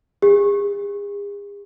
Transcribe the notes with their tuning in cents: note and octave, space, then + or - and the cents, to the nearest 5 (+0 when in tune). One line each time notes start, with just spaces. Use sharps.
G#4 -40